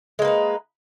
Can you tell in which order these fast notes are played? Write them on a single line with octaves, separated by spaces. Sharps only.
G#3 A#3 B4 D#4